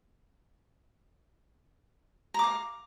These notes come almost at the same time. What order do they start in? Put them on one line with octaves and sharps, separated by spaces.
A#5 D6 F5